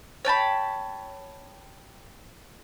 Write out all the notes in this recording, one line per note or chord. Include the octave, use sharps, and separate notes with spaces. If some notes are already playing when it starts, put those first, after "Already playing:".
C#5 G5 A5 B5